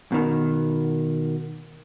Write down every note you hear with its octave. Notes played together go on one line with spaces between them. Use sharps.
B2 D#3